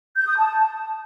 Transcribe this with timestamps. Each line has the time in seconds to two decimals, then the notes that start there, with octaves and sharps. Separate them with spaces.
0.17 G6
0.27 D#6
0.38 A5